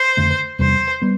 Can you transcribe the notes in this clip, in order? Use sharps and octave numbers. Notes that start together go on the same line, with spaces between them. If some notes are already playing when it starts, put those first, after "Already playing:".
Already playing: C5
F2 D3 A3
E2 C3 G3 C5
G3 B3